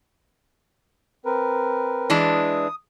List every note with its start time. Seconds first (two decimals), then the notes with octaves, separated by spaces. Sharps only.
1.25 C4 A#4 B4
2.10 E3 G#3 D4
2.34 D#6